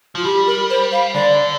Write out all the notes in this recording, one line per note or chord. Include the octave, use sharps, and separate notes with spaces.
F3 F4
G3 G4
A#4
C5
F5
D3 D5